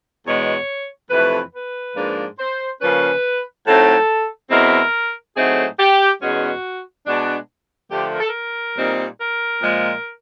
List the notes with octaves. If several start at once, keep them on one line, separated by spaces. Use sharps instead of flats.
E2 B2 G#3 C#5
F2 C3 E3 A3 B4
B4
G#2 F3 A#3 D4
C5
C#3 F3 A#3 C#4 B4
A2 F#3 A3 C4 D#4 A4
E2 B2 G#3 C4 E4 A#4
A2 F#3 A3 C4 D#4 G#4
G4
E2 B2 G#3 C#4 F#4
B2 G#3 B3 D4
D3 F3 A3 G4
A#4
A4
A#4
A#2 G3 C4 D#4
A#4
A#2 F3 G#3